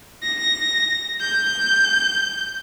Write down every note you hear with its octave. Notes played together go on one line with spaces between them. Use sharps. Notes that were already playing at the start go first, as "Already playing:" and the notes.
A#6
G6